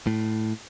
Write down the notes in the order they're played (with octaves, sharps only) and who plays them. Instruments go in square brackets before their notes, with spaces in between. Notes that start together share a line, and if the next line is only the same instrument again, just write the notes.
[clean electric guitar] A2